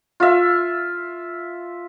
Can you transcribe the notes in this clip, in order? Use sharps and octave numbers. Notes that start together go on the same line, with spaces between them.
F4 E5